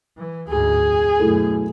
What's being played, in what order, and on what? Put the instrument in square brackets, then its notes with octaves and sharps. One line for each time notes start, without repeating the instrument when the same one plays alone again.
[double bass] E3
[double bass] D2 G#2 [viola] G#4
[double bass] F2
[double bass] F#2 B2 [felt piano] A3 E4 A4